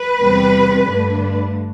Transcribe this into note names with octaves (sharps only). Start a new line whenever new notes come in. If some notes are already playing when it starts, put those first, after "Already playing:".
Already playing: B4
E2 C3 G3 C4
G2 D3 A3 D4